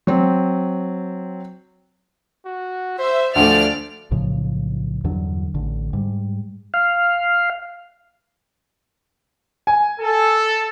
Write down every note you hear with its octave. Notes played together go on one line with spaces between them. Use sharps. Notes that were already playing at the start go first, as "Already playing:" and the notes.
F#3 C4
F#4
C5 E5
D2 F3 A3 D5 F6
B1 A2 C#3 F3
E2 G2 D3 F#3
A1 D3
G#2 G3
F5
G#5
A4